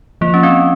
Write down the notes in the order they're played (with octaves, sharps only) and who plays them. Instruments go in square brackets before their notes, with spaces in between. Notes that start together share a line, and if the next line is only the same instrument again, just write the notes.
[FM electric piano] F3 [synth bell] A#3
[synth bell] C#4
C4